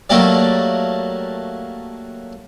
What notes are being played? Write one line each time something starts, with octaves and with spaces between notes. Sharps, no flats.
F#3 A3 A#3 G4 D5